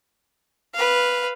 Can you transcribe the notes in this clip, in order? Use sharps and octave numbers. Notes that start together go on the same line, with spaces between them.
B4 F5